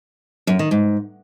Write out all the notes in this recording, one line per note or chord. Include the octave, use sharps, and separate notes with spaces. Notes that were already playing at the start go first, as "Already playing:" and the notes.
F#2
D#3
G#2